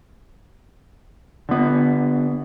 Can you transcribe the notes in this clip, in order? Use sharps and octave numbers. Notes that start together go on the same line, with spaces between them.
D3 B3